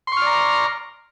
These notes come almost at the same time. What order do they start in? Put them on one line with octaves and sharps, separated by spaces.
C6 C#6 F6 D5 A#5